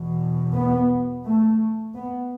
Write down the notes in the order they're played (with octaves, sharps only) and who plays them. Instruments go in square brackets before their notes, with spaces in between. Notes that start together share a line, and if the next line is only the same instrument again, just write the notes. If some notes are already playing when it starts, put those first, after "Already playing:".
Already playing: [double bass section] E2 B2
B3
A3
B3